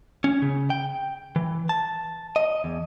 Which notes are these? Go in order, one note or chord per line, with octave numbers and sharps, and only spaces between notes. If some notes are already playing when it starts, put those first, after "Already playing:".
C#4
C#3
G5
E3
A5
D#5
E2